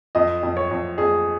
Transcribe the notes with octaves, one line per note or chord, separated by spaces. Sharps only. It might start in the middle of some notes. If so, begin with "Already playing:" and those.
F2 D#5
F2
C#5
F2
F2 G#4